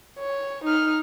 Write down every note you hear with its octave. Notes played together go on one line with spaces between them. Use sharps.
C#5
D#4 F6